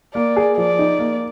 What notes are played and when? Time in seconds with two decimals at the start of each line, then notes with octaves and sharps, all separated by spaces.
0.14 A#3 D5
0.36 G#4
0.57 F3 D5
0.79 D#4
0.99 A#3